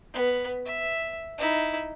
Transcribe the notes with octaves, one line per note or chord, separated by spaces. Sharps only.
B3
E5
D#4 E4